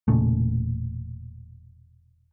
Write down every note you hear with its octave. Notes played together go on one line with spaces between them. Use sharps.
E1 A#2 C#3 A3